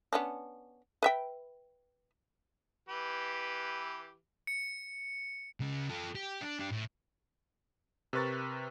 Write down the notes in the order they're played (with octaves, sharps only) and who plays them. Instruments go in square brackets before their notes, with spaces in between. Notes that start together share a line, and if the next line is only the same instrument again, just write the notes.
[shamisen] B3 C#4 D4
B4 E5 G5
[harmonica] E3 G4 B4
[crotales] C#7
[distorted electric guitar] C#3 G#3
F4 A4
G4
D4
D4 G4
A2
[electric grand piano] C3 A#4 B4 C#6 A6